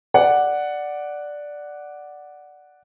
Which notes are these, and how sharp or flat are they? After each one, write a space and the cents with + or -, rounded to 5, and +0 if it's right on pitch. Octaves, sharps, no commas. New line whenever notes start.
D5 +0 F#5 +0